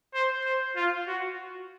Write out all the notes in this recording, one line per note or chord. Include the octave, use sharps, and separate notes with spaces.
C5
C5
F4
F#4